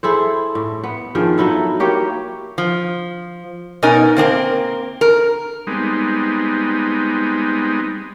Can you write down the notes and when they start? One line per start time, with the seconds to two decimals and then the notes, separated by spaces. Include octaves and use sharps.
0.03 E4 G#4 A4 C5
0.55 A2
0.84 B3
1.15 D#3 F3 D4 G#4
1.38 F#3 D#4 E4 A4
1.80 A#3 G4 C#5
2.58 F3
3.83 B2 C#4 D#4 A#4 G#5
4.16 A#3 C4 D4 A#4
5.01 A#4
5.67 G3 G#3 B3 C4 D#4